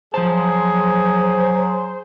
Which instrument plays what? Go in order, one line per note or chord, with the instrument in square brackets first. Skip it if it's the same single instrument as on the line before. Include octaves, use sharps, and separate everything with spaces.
[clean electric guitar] F3 A5 [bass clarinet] F#3 [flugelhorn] G#4 [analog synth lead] C5